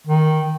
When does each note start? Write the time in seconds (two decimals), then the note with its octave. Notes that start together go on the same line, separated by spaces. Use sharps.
0.07 D#3